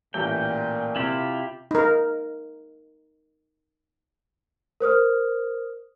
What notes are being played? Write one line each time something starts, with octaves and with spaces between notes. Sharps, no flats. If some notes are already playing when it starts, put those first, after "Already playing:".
A1 A#2 G5
C3 E4 F4 G4
D#4 A#4
A#4 C5 D#6 F6